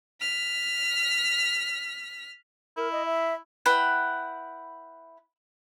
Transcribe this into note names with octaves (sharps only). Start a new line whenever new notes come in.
F6 B6
E4 A#4
D#5
E5
E4 B4 F#5 G5